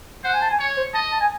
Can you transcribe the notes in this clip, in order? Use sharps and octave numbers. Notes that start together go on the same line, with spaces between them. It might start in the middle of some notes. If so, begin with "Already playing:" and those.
C5 F#5
G#5
A5
G#5
C#5
C5
D#5 A5
A5
G#5